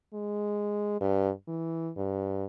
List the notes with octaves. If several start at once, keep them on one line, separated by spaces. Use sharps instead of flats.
G#3
G2
E3
G2